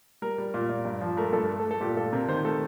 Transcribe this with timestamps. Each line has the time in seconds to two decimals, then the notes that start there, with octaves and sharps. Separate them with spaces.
0.22 G3 A#4
0.38 G3
0.54 A#2
0.69 A#2
0.85 G2
1.01 F3
1.17 A3 A#4
1.33 G2 A4
1.49 A3
1.60 A4
1.65 A3
1.71 A4
1.81 A#2 G4
1.97 A#2 A4
2.12 C3 A#4
2.28 D#3 C5
2.45 A3 A4